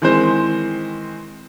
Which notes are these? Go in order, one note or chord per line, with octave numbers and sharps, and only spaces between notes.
D#3 E3 G#3 C4 C5